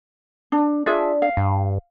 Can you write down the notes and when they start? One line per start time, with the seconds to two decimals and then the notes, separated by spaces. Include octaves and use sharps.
0.52 D4
0.86 D4 F4 G#4 E5
1.22 F5
1.37 G2